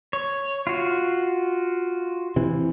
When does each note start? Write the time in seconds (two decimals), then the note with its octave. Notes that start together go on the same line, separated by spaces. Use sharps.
0.13 C#5
0.67 F4 F#4
2.36 C3 E3